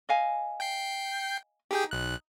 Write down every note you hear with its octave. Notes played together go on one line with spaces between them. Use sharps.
D#5 F5 G#5
G5 G6 C7
D#4 G4 G#4 G5
B1 F#6